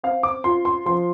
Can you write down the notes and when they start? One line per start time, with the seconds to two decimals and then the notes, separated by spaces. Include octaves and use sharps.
0.03 C4 F5
0.23 D6
0.44 F4 C6
0.65 C6
0.86 F3 C6